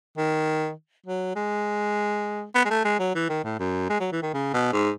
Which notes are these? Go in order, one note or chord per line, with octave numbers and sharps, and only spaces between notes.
D#3
F#3
G#3
B3
G#3
A3
G#3
F#3
E3
D#3
A2
F#2
G#3
F#3
E3
D#3
C#3
B2
G#2